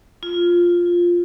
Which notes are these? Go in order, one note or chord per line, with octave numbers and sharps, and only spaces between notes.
F4